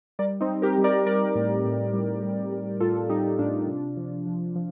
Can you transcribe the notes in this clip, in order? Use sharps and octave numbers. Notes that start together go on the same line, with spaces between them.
G3 A#4 D5
C4 D#4
G3
G4 A#4
G3
A#4 D5
G3 A#4 D5
A2
A2
G3
G3
G3
A2 F4 A4
G3 D#4 G4
A2 D4 F4
C3
F3
F3
F3